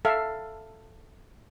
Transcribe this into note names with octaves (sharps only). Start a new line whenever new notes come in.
A4 E5 F5